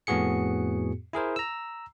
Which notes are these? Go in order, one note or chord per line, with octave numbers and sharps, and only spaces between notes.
F2 A2 B3 F#4 G#4 C#7
E4 G#4 A#4 C5
A#5 E6